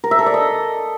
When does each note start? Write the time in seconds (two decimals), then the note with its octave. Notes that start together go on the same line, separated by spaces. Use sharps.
0.04 A#4
0.11 E5
0.19 A4
0.26 D5
0.34 D#5